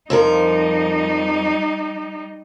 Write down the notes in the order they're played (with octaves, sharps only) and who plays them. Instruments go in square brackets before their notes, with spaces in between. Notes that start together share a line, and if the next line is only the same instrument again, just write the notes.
[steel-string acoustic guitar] F2 F3 A#4 [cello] G3 D#4